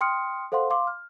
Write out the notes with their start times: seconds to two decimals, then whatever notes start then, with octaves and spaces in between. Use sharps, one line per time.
0.01 G5 C6 D#6 F6 C#7
0.52 A4 C5 F5 F#5 C6
0.70 F5 C6 D6
0.87 F6